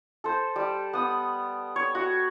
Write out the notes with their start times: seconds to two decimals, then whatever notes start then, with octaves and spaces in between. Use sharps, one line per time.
0.24 A4 C5
0.56 G3
0.93 B3 D#6
1.76 C#5
1.95 F#4